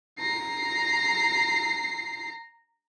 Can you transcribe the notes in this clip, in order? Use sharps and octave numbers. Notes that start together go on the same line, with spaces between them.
A#5 C7